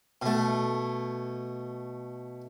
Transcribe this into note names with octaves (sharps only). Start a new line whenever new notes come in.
B2 A3